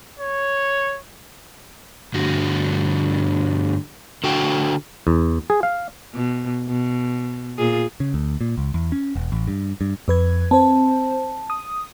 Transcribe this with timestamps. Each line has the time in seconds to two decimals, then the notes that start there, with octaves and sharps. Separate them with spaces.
0.19 C#5
2.14 G2 D3 A3 F#4
4.24 D3 F#4 G5
5.07 E2
5.50 G#4
5.63 F5
6.14 B2
6.68 B2
7.58 A#2 F4 G#4
8.00 C#3
8.14 D2
8.41 A#2
8.58 C#2
8.74 E2
8.92 C#4
9.16 E1
9.32 A1
9.48 G2
9.81 G2
10.08 F2 B4 G#6
10.51 C4 C5 A5
11.50 D#6